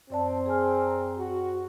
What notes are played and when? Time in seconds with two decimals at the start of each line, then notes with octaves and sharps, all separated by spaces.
0.10 F#2 C4 D5 A5
0.46 G#4 G#5 F6
0.86 A#5
1.18 F#4